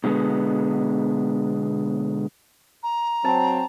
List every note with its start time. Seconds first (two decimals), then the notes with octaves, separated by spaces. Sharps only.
0.04 B2 D3 G#3 A3 B3
2.83 A#5
3.24 F#3 C4 A5